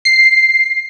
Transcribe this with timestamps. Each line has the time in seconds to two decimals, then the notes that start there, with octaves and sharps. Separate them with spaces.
0.05 C7